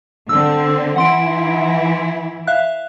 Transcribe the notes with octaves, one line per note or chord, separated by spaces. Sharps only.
D3 C4 E6
E3 E4 F#5 C6 D7
E5 F5 F#6